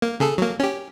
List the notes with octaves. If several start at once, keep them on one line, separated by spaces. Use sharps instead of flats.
A#3
C#3 G#4 A4
F#3 A#3
C#4 G4